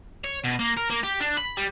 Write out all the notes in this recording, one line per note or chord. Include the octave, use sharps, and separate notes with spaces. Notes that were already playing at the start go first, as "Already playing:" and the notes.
C#5
B2
A#3
A#4
A#3
G4
D4
B5
G3